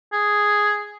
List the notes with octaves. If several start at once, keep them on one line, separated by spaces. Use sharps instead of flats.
G#4